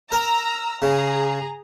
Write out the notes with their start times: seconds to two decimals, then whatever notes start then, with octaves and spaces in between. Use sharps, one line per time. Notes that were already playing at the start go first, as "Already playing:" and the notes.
0.12 A#4 A#5 E6
0.82 C#3 G#4 A#5